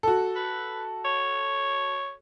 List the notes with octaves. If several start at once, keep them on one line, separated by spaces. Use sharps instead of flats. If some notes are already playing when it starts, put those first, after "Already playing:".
F#4 A4
B4
C#5